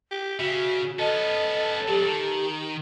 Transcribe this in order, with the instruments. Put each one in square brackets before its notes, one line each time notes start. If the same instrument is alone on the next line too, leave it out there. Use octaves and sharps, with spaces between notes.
[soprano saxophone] G4
[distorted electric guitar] C#3 [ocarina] F#4 [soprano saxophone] E5
[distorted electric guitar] B3 C#4 [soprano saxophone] A4 [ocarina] D#5
[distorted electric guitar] C3 F#3 [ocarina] G4
[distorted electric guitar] D#3